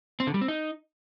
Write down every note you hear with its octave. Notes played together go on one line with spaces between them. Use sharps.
C4
D3
G3
C4
D#4